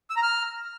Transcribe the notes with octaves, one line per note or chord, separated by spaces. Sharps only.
E6
A#5
F6